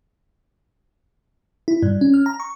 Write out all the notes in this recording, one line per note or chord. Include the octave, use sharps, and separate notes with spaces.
E4
G2
C#4
F6
A#5
C#6